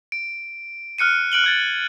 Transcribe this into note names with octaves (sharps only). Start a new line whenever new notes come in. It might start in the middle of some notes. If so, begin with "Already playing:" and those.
D7
F6 F#6 C#7 D#7
F#6 D7 F#7 G7
F6 G#6 A6